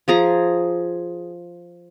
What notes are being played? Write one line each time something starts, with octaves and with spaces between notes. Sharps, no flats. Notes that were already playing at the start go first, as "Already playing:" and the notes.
F3 G#4 A#5